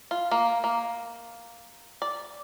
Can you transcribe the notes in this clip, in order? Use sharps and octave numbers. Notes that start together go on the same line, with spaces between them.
F4
A#3
A#3
D5